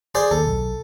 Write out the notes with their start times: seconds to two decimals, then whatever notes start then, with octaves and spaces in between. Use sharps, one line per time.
0.15 G#4 C5 D5
0.31 D#2 A4
0.46 B1